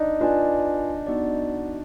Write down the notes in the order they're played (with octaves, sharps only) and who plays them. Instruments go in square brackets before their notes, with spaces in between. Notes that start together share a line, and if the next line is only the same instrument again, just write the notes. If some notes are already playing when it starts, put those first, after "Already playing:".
Already playing: [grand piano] D4 D#4
[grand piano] D4 [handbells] F4 B4 D5 G#5
[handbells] B3 D#4 F#4 D5